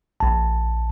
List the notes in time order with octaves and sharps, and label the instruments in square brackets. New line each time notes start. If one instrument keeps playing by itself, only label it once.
[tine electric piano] A#1 A5